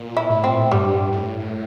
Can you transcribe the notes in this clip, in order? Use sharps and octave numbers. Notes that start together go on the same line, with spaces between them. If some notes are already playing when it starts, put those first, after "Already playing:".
Already playing: A#2
E4
A2
A#2 C4
A2
G2 G3
A2